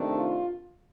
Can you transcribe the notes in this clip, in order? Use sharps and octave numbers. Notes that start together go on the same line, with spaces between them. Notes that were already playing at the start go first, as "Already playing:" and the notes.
Already playing: C3 D#3 A3 D4
F4